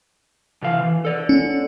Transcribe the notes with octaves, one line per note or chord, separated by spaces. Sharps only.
C3 E3 F5
E3
A4 D5
C#4